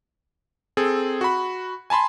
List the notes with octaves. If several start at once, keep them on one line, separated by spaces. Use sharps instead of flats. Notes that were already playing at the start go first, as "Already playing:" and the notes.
C4 G#4 A4
F#4 B5
G#5 A5 B5 C6